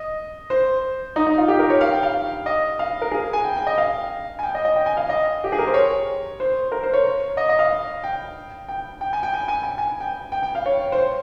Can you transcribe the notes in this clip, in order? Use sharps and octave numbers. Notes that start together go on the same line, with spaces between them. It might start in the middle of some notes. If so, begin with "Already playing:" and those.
Already playing: D#5
C5
D#4
D#4
F4
G4
A#4
C#5
F5
G5
F5
D#5
F5
A#4
G#4
G#5
G5
G5
D#5
F5
G#5
G5
D#5
D#5
G5
G#5
F5
D#5
G4
G#4
A#4
C5
C#5
C5
A#4
C5
C#5
D#5
D#5
F5
G5
G5
G5
G#5
G5
G#5
G#5
G#5
G#5
G5
G5
G5
F5
C#5
C5
C#5